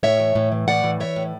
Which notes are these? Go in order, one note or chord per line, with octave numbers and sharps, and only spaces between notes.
A2 C#5 E5
E3
A2
E3
A2 D5 F#5
E3
E3 C#5 E5
A2